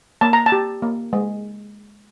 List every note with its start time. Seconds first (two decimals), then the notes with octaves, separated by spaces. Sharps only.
0.21 A#3 A5
0.33 A#5
0.46 A5
0.52 G4
0.82 A#3
1.13 G#3